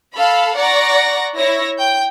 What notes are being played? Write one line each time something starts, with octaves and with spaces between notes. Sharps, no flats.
A4 F5 B5
D5 F#5 A#5 C#6 A#6
E4 C#5 A#6
G5 G6